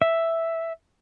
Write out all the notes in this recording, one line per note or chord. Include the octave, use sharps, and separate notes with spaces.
E5